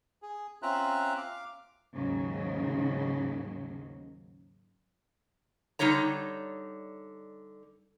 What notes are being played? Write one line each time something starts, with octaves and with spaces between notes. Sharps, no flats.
G#4
C4 C#4 F4 E5 A#5 F#6
F5 D6
D#2 G#2 C#3 F#3
D3 G3 D#4 G4 C#5 A#5